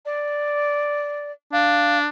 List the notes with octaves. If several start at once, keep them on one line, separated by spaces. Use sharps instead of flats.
D5
D4 F5